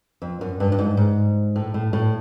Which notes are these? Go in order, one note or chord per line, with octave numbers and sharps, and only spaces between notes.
F2
F#2
G2
G2
G#2
G#2
A2
A2
A2